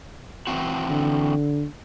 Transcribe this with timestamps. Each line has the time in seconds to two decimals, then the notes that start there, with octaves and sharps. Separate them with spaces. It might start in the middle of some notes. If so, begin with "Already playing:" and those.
0.47 E3 C4 F#4
0.90 D3